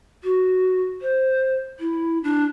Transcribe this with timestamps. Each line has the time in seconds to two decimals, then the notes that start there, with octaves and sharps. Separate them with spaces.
0.23 F#4
1.01 C5
1.79 E4
2.23 D4